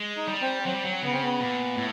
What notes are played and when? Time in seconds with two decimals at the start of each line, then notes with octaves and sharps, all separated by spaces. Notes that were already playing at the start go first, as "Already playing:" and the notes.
Already playing: G#3
0.17 D#4
0.28 G3
0.41 C4
0.65 F#3 C4
0.74 G3
0.85 F#3
1.02 C#3 B3
1.13 C4
1.22 B3
1.39 A#2
1.77 A2